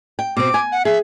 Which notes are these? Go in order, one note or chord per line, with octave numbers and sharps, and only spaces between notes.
G5
B2 C4 D6
G#5
F#5
G#4 E5